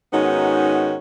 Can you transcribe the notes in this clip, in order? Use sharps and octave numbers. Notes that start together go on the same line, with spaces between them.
G#2 D#3 B3 C#4 D#4 F#4